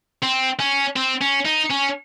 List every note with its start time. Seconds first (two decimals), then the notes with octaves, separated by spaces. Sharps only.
0.23 C4
0.60 C#4
0.96 C4
1.21 C#4
1.45 D#4
1.70 C#4